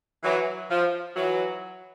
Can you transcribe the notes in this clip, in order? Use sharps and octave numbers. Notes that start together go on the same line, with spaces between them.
E3 F#3
F3
E3 F#3